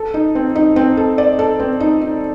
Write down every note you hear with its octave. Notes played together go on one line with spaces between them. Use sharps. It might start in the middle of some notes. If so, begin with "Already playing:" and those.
Already playing: A4
D#4
C4
D#4
C4
A4
D5
A4
C4
D#4
D#4